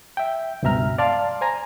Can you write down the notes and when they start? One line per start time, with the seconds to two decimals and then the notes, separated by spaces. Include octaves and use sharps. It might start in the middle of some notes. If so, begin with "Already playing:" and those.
0.17 E5 G5
0.63 C#2 G2 B2 E5 A#5 F6
0.98 D5 F5 A5 C6 F6
1.41 C5 G#5 A#5